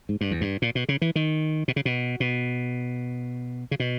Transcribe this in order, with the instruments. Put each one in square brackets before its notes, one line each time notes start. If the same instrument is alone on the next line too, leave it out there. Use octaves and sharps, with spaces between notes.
[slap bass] G#2
G2
E2
G2
A#2
B2
C#3
E3
D#3
B2
C#3
B2
B2
C#3
B2